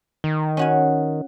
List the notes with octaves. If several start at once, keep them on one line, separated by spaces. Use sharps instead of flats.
D#3
C#4 F#4 G#5